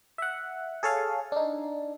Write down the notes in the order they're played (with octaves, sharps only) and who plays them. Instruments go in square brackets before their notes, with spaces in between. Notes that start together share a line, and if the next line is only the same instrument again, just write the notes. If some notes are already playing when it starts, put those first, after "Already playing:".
[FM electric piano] E5 F#5
G#4 A4 C#5 F5 G#5
D4 D#4